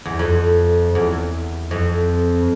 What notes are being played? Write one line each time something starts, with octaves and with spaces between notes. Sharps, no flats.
E2
F2
E2
F2